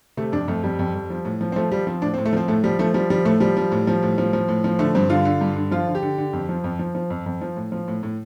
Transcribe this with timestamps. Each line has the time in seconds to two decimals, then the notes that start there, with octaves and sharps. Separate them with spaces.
0.17 C3 A3
0.32 F2 D4
0.48 F2 A3
0.63 F2 G3
0.79 F2
0.95 F2
1.10 F3
1.25 A2
1.41 F3
1.52 C4
1.56 F3 A3
1.71 F3 G3
1.87 F3 C4
2.02 A2 D4
2.14 C4
2.18 A2
2.25 A3
2.33 F3 C4
2.48 A2 A3
2.64 F3 G3
2.79 F3 A3
2.94 F3 G3
3.10 F3 G3
3.25 A2 A3
3.40 F3 G3
3.57 F3
3.72 A2
3.87 F3
4.03 A2
4.18 F3
4.33 F3
4.48 A2
4.64 F3
4.79 D3 A3
4.95 G2 C4
5.10 D3 F4
5.25 D3
5.41 G2
5.56 D3
5.71 F3 F4
5.87 D3
5.95 G4
6.03 D3
6.18 D3
6.33 F2
6.49 F3
6.64 F2
6.79 F3
6.95 F3
7.10 F2
7.26 F2
7.41 F3
7.57 A2
7.72 F3
7.88 A2
8.03 A2